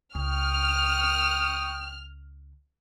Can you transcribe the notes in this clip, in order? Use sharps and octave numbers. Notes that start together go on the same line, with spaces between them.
C#2 G5 C#6 D#6 F6